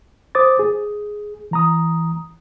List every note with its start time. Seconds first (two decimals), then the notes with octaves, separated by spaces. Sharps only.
0.35 C5 D6 D#6 A6
0.59 G#4
1.51 E3 A#5 D#6